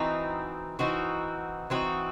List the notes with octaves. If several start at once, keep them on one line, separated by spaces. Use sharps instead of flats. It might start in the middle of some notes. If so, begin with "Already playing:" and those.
Already playing: E3 C4 D#4 F#4
E3 C4 D#4 F#4
E3 C4 D#4 F#4